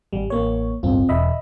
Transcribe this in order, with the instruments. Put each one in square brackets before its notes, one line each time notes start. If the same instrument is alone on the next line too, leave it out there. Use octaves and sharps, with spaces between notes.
[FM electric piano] G#1 G3
A1 A#3 C#5
[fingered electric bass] D1 G1 G2 [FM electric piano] C4 F4
[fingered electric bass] E1 [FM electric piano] D#5 E5 B5